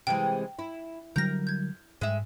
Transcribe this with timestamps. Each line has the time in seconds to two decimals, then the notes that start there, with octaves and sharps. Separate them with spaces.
0.07 C3 E3 G#3 G5
0.59 E4
1.16 D3 F#3 G3 A#4 G6 A#6
1.47 G6 G#6
2.01 G#2 G#3 E5